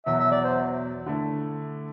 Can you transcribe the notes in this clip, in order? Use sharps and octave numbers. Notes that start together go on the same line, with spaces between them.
E2 B2 F#3 E5
E5
D5
C5
D3 A3 E4